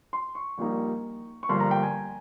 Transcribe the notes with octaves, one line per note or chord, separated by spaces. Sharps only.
C6
C#6
A#1 A#2 G3 A#3 D#4
C#6
G1 G2 F3 A#3 C6
A#5
G5
G#5